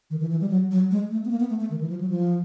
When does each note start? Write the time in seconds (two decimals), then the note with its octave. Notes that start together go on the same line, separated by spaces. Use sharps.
0.10 D#3
0.20 E3
0.31 E3
0.41 G3
0.50 F#3
0.71 F#3
0.91 G#3
1.11 A3
1.25 B3
1.31 A#3
1.40 B3
1.49 A3
1.60 A3
1.70 D#3
1.81 E3
1.90 F3
2.00 F#3
2.09 F3